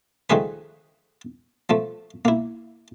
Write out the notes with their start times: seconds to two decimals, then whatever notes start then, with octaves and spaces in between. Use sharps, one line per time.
0.30 D#3 F3 A3 G#4 B4
1.70 F3 A3
2.25 A#3 E4